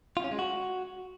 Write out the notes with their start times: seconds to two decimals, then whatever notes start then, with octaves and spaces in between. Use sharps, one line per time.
0.17 F4
0.24 C#4
0.31 G#3
0.39 F#4